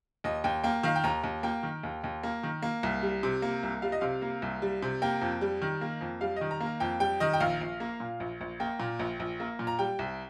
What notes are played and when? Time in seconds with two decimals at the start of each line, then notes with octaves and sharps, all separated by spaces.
0.24 D#2 D#5
0.44 D#2 G5
0.64 A#3 G5
0.83 D#3 F5
0.96 G5
1.04 D#2 A#5
1.24 D#2
1.43 A#3 G5
1.63 D#3
1.83 D#2
2.04 D#2
2.23 A#3
2.43 D#3
2.62 A#3
2.83 C2
3.03 G3
3.23 C3
3.42 A#3
3.63 C2
3.82 G3 F5
3.92 D#5
4.01 C3 F5
4.22 A#3
4.42 C2
4.62 G3
4.83 C3
5.02 A#3 G5
5.21 F2
5.41 G3
5.62 D#3
5.81 A#3
6.01 F2
6.21 G3 F5
6.36 D#3 D#5
6.51 A#5
6.61 A#3
6.66 A#5
6.80 F2 G5
7.00 G3 G5
7.20 D#3 D#5
7.33 G5
7.40 A#1 F5
7.61 A#1
7.80 A#3
8.00 A#2
8.20 A#1
8.41 A#1
8.60 A#3 G5
8.80 A#2
8.99 A#1
9.20 A#1
9.40 A#3
9.59 A#2
9.67 A#5
9.79 G3 G5
9.99 C2